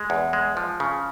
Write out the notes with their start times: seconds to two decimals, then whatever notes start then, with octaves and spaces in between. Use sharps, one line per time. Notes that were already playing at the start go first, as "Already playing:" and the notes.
Already playing: G#3
0.10 E2
0.33 G#3
0.57 F3
0.80 C#3